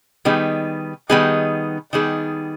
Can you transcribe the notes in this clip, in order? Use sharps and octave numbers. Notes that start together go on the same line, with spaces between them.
D#3 G3 B3 D#4 G#4
D#3 G3 B3 D#4 G#4
D#3 G3 B3 D#4 G#4